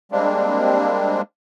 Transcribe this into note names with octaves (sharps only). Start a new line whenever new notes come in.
G3 G#3 A#3 C4 D4